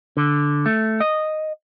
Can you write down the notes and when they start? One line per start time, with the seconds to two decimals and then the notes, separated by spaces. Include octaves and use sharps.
0.17 D3
0.66 A3
1.00 D#5